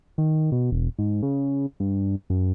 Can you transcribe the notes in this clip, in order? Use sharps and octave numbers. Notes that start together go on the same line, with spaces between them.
D#3
B2
E1
G#2
C#3
G2
F#2